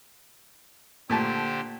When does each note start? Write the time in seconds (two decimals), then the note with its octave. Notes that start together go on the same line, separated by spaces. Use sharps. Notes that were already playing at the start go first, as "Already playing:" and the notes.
1.10 A#2 D3 A3 G4 C5 A5